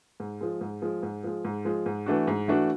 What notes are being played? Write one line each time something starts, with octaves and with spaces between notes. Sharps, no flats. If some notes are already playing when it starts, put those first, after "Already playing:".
G#2
F3 G#3
G#2
F3 G#3
G#2
F3 G#3
G#2
F3 G#3
G#2
E3 A3 D4 F#4
G#2
E3 A3 D4 F#4